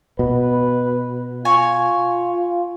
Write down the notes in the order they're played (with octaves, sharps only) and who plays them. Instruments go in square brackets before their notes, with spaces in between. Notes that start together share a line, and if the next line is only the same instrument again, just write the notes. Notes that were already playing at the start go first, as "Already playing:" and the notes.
[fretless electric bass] B2 [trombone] B4
[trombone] F4 [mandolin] C#5 G#5